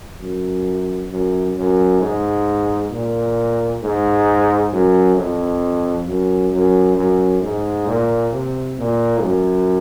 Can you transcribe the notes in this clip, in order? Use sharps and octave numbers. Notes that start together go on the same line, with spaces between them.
F#2
F#2
F#2
G#2
A#2
G#2
F#2
F2
F#2
F#2
F#2
G#2
A#2
C3
A#2
F#2